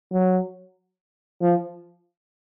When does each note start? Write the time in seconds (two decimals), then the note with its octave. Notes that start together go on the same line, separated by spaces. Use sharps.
0.12 F#3
1.41 F3